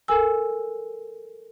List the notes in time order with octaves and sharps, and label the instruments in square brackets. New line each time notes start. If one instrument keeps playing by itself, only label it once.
[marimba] A4 A#4 G#5 E6